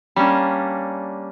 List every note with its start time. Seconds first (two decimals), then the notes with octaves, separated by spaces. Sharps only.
0.16 G3 A#3 C#4 D4